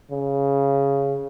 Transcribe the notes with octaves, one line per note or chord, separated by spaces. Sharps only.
C#3